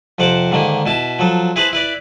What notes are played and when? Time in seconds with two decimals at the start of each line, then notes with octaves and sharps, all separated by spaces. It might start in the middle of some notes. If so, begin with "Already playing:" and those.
0.18 F2 C3 C5 F#5 D6
0.51 G#2 D3 D#3 A#3
0.86 B2 E4 A5
1.19 F3 F#3 A4
1.56 E4 G#4 B4 C5 A5 B5
1.73 E4 B4 D5